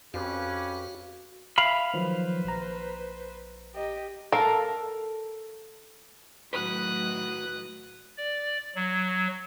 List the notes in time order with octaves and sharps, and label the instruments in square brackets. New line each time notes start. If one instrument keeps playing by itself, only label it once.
[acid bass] F2 [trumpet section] C#4 G4 B4 [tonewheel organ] F#4 F5
[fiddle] E5 [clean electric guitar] F5 B5
[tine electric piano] D#3 F3 F#3 [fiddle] B4 C5
[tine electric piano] A#1 A#5
[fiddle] G4 D#5
[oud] A4 F5 [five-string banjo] A#4
[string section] A2 D#3 F#3 [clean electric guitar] F#4 B4 [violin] D#6 F#6
[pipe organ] D5
F#3